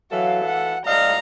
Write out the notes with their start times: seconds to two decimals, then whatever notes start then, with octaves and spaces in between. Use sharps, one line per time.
0.11 E3 F#3 A4 F5
0.44 F#5
0.86 A2 D5 D#5 F5 A#5